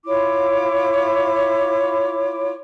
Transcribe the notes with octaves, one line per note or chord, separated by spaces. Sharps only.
E4 F4 C#5 D6